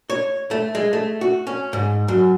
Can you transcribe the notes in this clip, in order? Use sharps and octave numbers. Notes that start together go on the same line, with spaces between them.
C#5
A3
G#3
A3
F#4
C#4
G#2
F#2